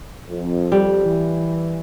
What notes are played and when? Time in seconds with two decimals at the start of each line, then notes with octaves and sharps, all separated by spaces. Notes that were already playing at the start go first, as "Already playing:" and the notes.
0.29 F2
0.72 G3
1.05 E3